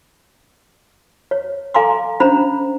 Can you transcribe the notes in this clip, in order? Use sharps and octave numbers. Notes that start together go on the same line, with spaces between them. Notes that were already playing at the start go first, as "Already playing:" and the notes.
C#5
A4 F5 G#5 A#5 C6 D6
C#4 D4 C5 A#5 B5